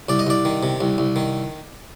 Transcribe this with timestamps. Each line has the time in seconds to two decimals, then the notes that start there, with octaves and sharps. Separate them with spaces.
0.09 C2 D5
0.19 D#5
0.27 C2 D5
0.45 D#3
0.63 C3
0.81 C2
0.98 C2
1.16 D#3